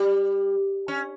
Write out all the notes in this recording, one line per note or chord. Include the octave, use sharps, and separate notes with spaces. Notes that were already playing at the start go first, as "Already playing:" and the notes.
Already playing: G3
C#4